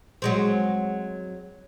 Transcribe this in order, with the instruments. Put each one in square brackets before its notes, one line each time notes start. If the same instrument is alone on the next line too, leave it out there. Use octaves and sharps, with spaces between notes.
[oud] F#3 G#3 C4